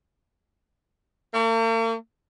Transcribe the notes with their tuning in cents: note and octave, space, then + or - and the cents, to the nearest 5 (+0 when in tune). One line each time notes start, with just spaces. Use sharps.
A#3 -45